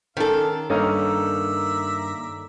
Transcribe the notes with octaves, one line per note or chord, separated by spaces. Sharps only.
D#3 C#4 D4 A4 F5 A5
G2 A#3 C#4 D#4 A#4 D5 E5 A#5